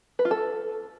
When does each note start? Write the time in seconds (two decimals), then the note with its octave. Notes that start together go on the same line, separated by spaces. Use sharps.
0.19 B4
0.25 F4
0.31 A4